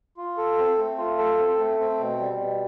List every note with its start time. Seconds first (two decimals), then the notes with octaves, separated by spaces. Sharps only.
0.17 F4
0.37 A4
0.58 C4
0.78 A3
0.98 F4
1.18 A4
1.39 C4
1.59 A3
1.79 C4
2.00 B2
2.20 G3
2.40 B2